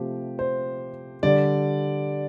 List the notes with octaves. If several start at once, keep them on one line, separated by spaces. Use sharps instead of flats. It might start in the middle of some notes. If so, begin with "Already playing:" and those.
Already playing: C3 F3 A3 G4
C5
D3 G3 D5